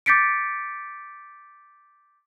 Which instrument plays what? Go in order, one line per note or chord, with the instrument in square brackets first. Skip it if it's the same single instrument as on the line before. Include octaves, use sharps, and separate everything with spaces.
[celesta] D6 G6 A6 B6 C#7 D7